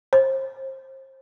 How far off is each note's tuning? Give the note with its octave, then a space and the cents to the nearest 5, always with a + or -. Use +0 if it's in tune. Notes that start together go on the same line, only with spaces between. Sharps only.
C5 +30